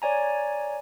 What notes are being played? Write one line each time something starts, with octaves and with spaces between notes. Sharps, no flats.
C#5 D5 G#5 A#5